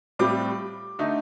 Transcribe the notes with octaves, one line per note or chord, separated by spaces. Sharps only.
A2 G3 C4 F4 D6
D3 A3 D#4